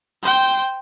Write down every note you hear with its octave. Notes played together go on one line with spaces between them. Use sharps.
C5 G5